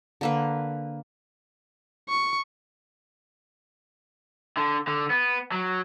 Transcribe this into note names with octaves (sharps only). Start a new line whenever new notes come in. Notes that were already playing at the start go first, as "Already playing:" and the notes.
D3 A#3 B4
C#6
D3
D3
B3
F#3